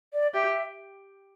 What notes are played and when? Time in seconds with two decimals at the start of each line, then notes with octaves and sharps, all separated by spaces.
0.13 D5
0.34 G4 E5